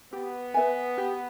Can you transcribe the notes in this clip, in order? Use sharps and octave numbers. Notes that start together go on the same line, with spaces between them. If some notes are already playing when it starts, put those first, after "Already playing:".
B3 G4
B4 E5 G#5
G4